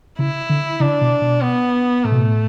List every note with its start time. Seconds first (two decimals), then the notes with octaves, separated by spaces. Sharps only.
0.19 C#3 E4
0.50 D3
0.80 C#3 D4
1.01 B2
1.22 B2
1.43 B3
2.04 A2 A3
2.12 B2
2.20 A2